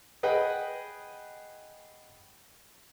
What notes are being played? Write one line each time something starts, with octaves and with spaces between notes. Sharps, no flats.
G#4 B4 D#5 F#5 G5